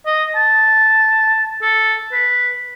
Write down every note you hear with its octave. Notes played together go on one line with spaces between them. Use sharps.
D#5
A5
A4
B4